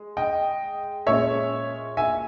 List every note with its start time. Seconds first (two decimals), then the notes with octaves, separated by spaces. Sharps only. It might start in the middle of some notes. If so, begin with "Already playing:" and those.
Already playing: G#3
0.17 D#5 G5
1.07 A#2 G#3 C#4 C#5 E5
1.97 E5 G#5